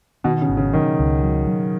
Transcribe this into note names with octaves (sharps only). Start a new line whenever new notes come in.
B2 D#3
C#3
G#1
C#3
D#3 F#3
C#2
F#3
F#3